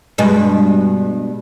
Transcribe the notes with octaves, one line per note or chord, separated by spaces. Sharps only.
G2 B2 G#3